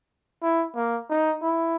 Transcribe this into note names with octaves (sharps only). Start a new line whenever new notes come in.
E4
A#3
D#4
E4